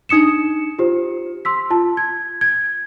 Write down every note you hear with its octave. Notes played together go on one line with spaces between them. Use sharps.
D4 D#4 D#6 C#7 E7
F4 G4 C5
C6 E6 B6
F4 A5
G#6
G#6